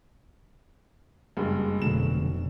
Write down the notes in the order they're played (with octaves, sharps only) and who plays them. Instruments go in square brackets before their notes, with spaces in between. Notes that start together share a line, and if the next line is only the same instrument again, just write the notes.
[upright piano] F#1 G2 G#3
[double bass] F1 [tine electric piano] B2 D3 [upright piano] F#3 E7